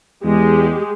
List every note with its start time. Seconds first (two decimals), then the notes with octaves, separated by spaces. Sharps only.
0.24 E2 G#3 G4